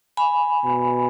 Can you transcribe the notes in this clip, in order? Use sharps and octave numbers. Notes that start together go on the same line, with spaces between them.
G#5 B5
B2